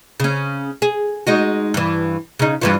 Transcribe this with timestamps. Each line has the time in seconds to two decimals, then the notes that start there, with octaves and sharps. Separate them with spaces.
0.20 C#3 C#4
0.82 G#4
1.27 G#3 D#4 F#4
1.74 G2 E3
2.39 C#3 D#4
2.62 G2 E3 F4